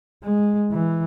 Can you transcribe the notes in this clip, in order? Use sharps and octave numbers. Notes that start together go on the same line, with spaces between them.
G#3
E3